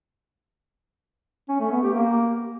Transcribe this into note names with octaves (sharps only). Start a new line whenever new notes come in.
C#4
A3
B3
G4
A#3